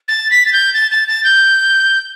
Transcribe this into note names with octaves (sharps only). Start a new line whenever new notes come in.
A6
B6
A6
G6
A6
A6
A6
G6